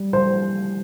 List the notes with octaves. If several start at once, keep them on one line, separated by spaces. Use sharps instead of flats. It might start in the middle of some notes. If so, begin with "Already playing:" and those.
Already playing: G3
C5